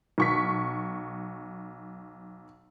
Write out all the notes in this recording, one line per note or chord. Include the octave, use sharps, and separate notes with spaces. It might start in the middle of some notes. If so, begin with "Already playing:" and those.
B1 C#6 B6